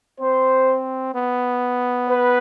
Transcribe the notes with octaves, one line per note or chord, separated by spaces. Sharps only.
C4 C5
B3
B4